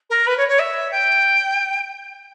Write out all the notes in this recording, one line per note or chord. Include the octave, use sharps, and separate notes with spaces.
A#4
B4
C#5
C#5
E5
G5